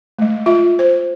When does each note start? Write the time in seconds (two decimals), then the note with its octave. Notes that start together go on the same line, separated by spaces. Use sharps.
0.19 G#3 A3
0.46 F4 E5
0.79 C5